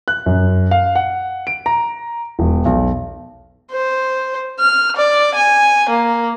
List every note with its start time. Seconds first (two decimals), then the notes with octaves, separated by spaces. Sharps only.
0.08 F#6
0.26 F#2
0.71 F5
0.95 F#5
1.47 D7
1.66 A#5
2.39 E1
2.65 B1
3.72 C5
4.59 F6
4.96 D5
5.34 G#5
5.89 A#3